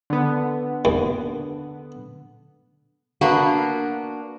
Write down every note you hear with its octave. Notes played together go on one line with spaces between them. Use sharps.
D3 B3
D#2
A#3 B3 D4 F#4